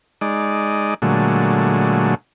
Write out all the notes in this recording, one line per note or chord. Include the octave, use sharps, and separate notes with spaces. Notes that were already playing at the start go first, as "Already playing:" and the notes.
G#3 D#4 D5
A#2 D3 F#3 G#3 A3